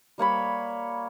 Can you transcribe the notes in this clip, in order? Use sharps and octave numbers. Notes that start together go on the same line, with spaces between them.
G3 A#3 C#5 B5